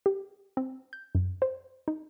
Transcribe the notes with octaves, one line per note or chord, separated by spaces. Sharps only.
G4
C4
G6
F#2
C5
D#4